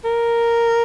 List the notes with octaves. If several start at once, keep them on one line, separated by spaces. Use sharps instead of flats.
A#4